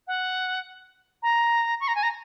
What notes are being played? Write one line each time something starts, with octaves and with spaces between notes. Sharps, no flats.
F#5
A#5
C#6
A#5
G#5
A#5